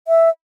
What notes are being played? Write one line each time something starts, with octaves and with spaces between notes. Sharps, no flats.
E5